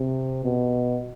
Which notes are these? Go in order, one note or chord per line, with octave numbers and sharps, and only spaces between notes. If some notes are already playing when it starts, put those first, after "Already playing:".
Already playing: C3
B2